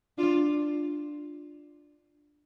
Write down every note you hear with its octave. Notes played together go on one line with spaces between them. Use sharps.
D4 F4